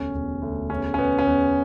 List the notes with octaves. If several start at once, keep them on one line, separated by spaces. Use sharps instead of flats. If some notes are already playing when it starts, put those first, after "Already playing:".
Already playing: E1 D2 C#4
E1
D2
E2 C#4
C#4
B2 B3
C#4
E2 B3